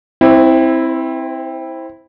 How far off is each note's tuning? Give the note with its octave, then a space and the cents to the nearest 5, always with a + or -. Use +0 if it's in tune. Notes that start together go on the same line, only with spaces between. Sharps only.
C4 +10 E4 -10 C5 -35